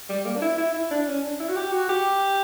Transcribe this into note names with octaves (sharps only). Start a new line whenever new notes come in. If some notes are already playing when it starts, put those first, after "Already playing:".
G3
A#3
D4
E4
E4
E4
D4
C#4
D4
E4
F#4
G4
F#4
G4